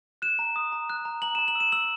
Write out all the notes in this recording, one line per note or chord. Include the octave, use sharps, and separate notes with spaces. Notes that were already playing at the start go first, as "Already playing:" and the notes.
F#6 E7
A#5
D#6
A#5
F#6
A#5
A#5 F#7
A#5 E7
F#7
E6
E7
E6 F#7